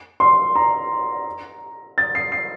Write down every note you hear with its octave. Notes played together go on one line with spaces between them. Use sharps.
C6
A#5
A6
C7
C7